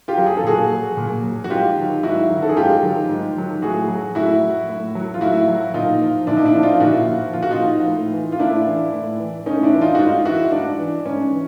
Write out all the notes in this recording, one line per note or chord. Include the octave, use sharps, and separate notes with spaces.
F4 G4
F#3
G#4
A4
A#2 F#4 G#4
F#3
A#2
F#3
F#4
G#2 F4 G4
D#3 F#3
G#2 E4 F#4
D#3 F#3
A4
G#4
G#2 F4 G4
D#3 F#3
G#2
D#3 F#3
A2 F#4 G#4
F#3
A2 E4 F#4
F#3
A2
F#3
F4
A2 E4 F#4
F#3
A#2 D#4 F4
F3
A#2 D4 E4
D#4
D4 E4
F3
D#4 F4
A#2 E4 F#4
F3
A#2 F4
F#4
D#4 F4
F3
A2
E3
F4
A2 D4 E4
E3
A2
E3
A2 C#4 D#4
D4 E4
E3
D#4 F4
F#4
G#2 D#4 F4
E3 E4 F#4
G#2 D4
E3
G#2 C#4
E3